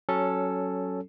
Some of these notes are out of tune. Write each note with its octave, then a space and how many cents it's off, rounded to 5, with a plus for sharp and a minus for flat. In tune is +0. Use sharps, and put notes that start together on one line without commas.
F#3 +15 C#4 +0 A4 +0